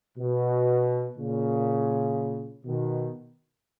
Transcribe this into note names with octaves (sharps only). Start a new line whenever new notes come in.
B2
A#2 C#3
B2 D#3